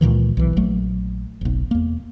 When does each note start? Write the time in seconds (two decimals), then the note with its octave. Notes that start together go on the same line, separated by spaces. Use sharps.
0.01 C#2 A#2 D#3 E3
0.37 B1 E3
0.57 A#1 F#3 A3
1.41 F#1 B1
1.71 E2 A#3